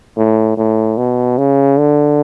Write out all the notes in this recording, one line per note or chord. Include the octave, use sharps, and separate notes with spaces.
A2
A2
B2
C#3
D3